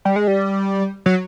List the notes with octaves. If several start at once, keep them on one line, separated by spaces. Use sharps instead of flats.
G3
G#3
G3
F#3